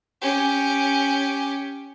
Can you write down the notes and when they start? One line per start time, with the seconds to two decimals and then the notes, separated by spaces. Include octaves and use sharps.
0.22 C#4 G4